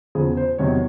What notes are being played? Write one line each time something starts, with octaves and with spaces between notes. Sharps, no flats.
E2 C#3 F3 G#4
C5
E2 C3 D#3 F#3 C#5